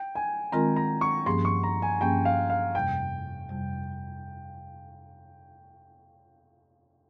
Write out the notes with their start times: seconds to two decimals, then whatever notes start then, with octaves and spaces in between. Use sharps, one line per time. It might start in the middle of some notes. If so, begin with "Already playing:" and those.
Already playing: G5
0.15 G#5
0.52 D#3 G#3 C4 F4 A#4 A#5
0.76 A#5
1.01 C#6
1.26 G2 F3 A#3 C#4 G#4 C6
1.45 C#6
1.63 A#5
1.82 G#5
2.01 G2 F3 A#3 C#4 G#4 G5
2.25 F5
2.50 F5
2.75 F2 C3 G3 G5
3.49 F2 C3 G3